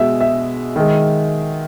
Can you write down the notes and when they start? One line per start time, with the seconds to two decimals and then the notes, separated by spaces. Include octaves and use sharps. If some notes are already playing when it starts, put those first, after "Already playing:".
Already playing: B2 G#3 E5
0.21 E5
0.76 D#3 G#3